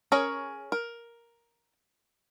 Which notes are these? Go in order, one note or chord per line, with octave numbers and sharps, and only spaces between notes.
C#4 G#4 A#4 C#5 A#5
A#4